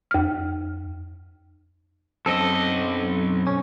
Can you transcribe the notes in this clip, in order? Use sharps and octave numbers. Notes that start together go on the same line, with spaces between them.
F2 F6
B1 F#2 C4 A4 D#5
C#4